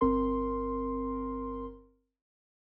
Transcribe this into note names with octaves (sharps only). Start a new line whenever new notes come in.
G1 C4 A#4 C6